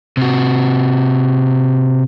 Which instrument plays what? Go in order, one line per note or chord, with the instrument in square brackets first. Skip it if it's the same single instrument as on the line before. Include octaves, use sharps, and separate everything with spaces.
[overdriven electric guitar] C3 F#4